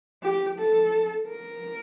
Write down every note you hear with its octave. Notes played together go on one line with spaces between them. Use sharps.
G4
A4
A#4